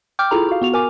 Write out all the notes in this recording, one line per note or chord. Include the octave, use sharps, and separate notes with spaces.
G5 D6 F6 G6
E4 F4 G#4 A4 A#5 B5
F#4 F5
B3 F#4 F7
A#4 G#5 D6